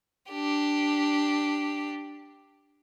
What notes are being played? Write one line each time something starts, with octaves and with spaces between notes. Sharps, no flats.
D4 G4